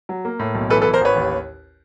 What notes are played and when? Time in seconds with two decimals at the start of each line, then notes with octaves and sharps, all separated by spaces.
0.09 F#3
0.25 A#3
0.39 A2
0.55 B1
0.70 E3 A4 B4
0.82 A4 B4
0.86 E3
0.93 A#4 C5
1.01 A1 B4 C#5
1.16 D#2